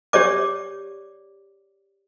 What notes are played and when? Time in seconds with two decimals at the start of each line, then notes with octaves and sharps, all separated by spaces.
0.13 G4 C#5 D5 D6